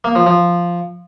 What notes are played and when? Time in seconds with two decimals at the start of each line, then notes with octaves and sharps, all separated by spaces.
0.04 A#3
0.15 F3
0.26 F3